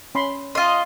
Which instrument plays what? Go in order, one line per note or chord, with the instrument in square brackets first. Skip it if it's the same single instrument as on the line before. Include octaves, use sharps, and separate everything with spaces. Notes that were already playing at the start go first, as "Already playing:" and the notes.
[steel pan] C#4 B5 C6
[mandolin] F4 D#5 [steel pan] C6